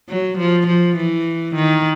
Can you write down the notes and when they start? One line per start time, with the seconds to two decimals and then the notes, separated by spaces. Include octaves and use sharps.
0.09 F#3
0.38 F3
0.67 F3
0.97 E3
1.56 D#3